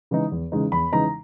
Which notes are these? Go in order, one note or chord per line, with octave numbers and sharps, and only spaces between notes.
C#3 E3 G#3 D#4
E2
C#3 E3 G#3 D#4
E2 B5
C#3 E3 G#3 D#4 A#5